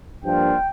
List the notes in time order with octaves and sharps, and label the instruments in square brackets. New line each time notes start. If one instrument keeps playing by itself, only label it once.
[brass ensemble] G2 F3 A#3 D4 F4 G5